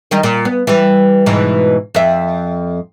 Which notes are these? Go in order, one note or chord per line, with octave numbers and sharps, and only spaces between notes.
D#3 G3 D#4
A#2
B3
E3 G3
G#2 B2 E3
F2 E5